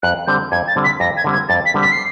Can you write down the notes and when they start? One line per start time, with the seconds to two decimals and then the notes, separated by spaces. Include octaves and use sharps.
0.03 F2 F#6
0.27 D3 G3 C4 G6
0.52 F2 G#6
0.68 A6
0.76 D3 G3 C4
0.84 B6
1.00 F2 A#6
1.17 G#6
1.24 D3 G3 C4
1.33 G#6
1.49 F2 A6
1.66 B6
1.74 D3 G3 C4
1.82 B6
1.92 C7